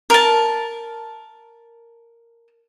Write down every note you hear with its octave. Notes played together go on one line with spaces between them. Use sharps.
A#4 A5